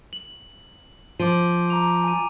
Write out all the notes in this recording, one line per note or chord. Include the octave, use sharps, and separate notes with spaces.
F#7
F3 D6 D7 D#7
A#5 D6 F7
G#5 D#7